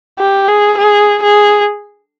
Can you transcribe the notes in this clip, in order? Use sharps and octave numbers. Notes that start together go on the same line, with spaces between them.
G4
G#4
G#4
G#4